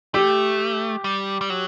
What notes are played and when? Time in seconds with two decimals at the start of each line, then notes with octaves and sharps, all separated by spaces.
0.14 A3 G4
1.04 G3
1.41 G3
1.50 F#3